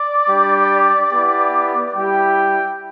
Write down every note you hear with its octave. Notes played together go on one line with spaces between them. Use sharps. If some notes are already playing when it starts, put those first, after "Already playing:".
Already playing: D5
G3 D4 G4
B3 E4 G4
G3 E4 G4 G5